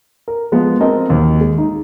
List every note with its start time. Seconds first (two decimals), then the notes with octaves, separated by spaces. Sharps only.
0.28 A#4
0.52 F3 G#3 B3
0.80 C4 F#4 A#4 D#5 A5
1.10 D#2
1.41 G#3
1.58 D#4